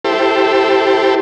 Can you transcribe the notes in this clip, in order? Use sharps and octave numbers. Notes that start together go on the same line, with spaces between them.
E4 G4 A4 C5